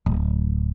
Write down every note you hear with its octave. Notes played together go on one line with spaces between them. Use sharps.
D1